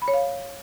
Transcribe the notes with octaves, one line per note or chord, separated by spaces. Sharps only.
B5
C#5
F5